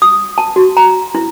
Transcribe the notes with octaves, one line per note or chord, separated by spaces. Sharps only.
D#6
A5
F#4
A#5
E4